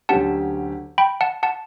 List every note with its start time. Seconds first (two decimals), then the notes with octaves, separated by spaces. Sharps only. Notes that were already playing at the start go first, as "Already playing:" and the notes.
0.09 D2 D3 F#3 C#4 G4 F#5 A5
0.98 G5 B5
1.21 F#5 A5
1.43 F#5 A5